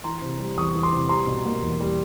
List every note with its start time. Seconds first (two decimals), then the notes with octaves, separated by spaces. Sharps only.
0.04 E3 A#5 C6
0.22 C3
0.39 G3
0.57 E2 C#6 D#6
0.75 E3
0.83 C6 D6
0.93 C3
1.09 G3 A#5 C6
1.27 B2
1.46 A#3
1.62 E2
1.80 G3